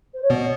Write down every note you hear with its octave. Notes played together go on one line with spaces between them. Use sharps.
C5
C#5
B2 B3 D5